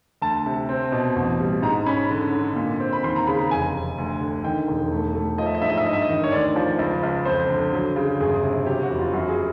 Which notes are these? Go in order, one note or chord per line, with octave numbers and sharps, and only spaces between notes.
D2 A5
C3
C4
B2
A1
G3
G#2 A#5
C#4 B5
D3
D3
A#2
C4
B5
D#2 C6
A#5
C#3 B5
A#5
F1 G#5
F1
D2
D3
D#3 G5
E1
A3
A3
F3 D#5
E5
D#5
G#2 E5
D#5
E5
G2 D#5
E5
D#5
D#3
C#5
D2 D5
F3
C#2
C#2
F2 C5
D3
F#3
C#3
G1 G#4
C3
F#3 G4
F#4
F1
F4
F#2 F#4
G#4